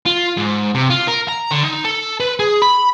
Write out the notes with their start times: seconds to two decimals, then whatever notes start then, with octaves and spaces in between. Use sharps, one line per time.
0.06 F4
0.38 G#2
0.75 C3
0.90 F4
1.07 A#4
1.28 A#5
1.51 D3
1.63 D#4
1.84 A4
2.20 B4
2.39 G#4
2.62 B5